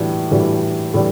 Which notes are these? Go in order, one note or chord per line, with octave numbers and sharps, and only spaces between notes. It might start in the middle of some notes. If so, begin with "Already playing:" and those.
Already playing: A2 E3 G3 D4 F#4
A2 E3 G3 D4 F#4
A2 E3 G3 D4